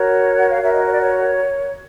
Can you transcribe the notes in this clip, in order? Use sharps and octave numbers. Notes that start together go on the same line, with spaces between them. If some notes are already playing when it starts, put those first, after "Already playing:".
Already playing: F#4 A#4 C#5
F#5
F5
F#4 A#4 C#5 E5
D#5
C#5
D5
C#5